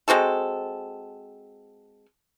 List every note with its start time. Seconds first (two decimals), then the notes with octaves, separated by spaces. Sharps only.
0.08 G#3 C4 F#4 A4